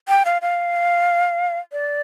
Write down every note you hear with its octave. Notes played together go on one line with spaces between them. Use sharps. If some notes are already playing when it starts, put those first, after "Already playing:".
G5
F5
F5
D5